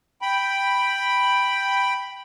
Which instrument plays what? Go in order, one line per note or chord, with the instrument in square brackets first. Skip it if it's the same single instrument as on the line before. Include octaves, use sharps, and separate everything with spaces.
[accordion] G5 B5